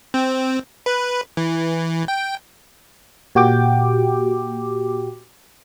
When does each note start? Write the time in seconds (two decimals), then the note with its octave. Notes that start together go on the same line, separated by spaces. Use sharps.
0.14 C4
0.86 B4
1.37 E3
2.08 G5
3.35 A#2 F#4 G4 G5 D6